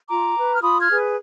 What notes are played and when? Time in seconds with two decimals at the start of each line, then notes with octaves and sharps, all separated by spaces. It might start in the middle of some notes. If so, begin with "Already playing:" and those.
0.08 F4 A#5 D6
0.36 B4
0.54 F6
0.62 F4 B5 D#6
0.80 F6 G#6
0.88 G#4 B4